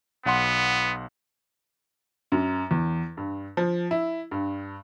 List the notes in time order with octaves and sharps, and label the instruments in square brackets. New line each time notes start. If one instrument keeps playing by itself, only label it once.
[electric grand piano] B1 F#5 C6 [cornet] B3
[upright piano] F#2
E2
G2
F3
E4
G2